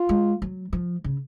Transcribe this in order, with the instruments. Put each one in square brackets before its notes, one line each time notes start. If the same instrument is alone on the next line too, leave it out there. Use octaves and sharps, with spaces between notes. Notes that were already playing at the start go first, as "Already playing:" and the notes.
Already playing: [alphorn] F4
[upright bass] G#3
F#3
F3
C#3